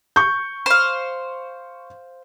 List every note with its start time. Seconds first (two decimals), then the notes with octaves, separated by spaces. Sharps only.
0.16 C#6 G6
0.66 C5 F5